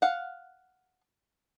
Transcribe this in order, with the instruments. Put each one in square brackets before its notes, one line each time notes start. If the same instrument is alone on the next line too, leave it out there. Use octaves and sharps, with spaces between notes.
[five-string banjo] F5 F#5